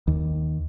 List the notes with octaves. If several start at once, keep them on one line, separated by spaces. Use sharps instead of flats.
D#2